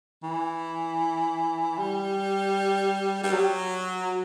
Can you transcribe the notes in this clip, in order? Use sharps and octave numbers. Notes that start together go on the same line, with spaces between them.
E3
G3
G3
F#3